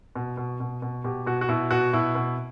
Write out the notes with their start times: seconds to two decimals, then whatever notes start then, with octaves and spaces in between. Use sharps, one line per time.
0.15 B2
0.37 B2
0.60 B2
0.82 B2
1.04 B2 G4
1.26 B2 F#4
1.41 F#4
1.49 B2 E4
1.71 B2 F#4
1.93 B2 E4
2.15 B2